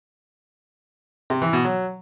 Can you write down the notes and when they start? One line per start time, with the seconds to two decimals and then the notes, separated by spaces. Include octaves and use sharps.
1.30 C3
1.42 E3
1.53 B2
1.65 F#3